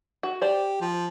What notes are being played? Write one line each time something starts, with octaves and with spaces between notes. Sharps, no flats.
F#4
G4 C5 D5
F3